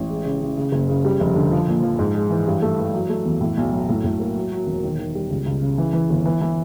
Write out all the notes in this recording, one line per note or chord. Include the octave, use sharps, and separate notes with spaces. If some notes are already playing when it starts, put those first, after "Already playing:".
Already playing: A1
G#3
C#3
C#3
C#3
F#1
C#3
G3
F1
D3
F3
A#2
F3
G#2
G#3
E3
G2
A3
E3
F#3
A3
E2
A2
B1
F#3
A2
A2
A#3
F#3
F#3
E1
D#3
D#3
G3
C#2
C#2
C#3
E3
E3
G1
E3
E3